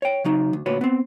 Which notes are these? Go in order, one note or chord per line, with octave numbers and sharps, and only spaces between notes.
C#5 G5
C#3 F#3 D#4
D2
D2 A#2 F#4 B4 C#5
B3 C4